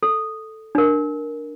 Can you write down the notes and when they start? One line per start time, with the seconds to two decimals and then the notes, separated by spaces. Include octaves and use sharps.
0.03 A4
0.75 D4 A#4